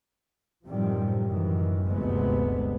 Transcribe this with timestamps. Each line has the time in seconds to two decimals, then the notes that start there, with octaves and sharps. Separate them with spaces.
0.67 F#2 A2 C3 D#3 F3 G3
1.21 F#2 D#3 E3
1.85 G1 D2 C3 G#3 A3 B3